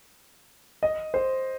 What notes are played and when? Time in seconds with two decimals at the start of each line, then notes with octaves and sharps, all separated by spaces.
0.83 D#5
1.14 C5